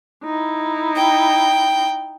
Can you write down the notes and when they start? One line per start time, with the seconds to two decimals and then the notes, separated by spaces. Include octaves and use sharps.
0.24 D#4 E4
0.96 G5